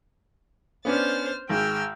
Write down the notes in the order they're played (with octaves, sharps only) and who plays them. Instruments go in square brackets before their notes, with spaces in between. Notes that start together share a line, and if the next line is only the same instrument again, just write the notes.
[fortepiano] B3 C#4 D4 [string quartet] C5 F6 A6
[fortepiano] G#1 G#3 [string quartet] G5 E6 F6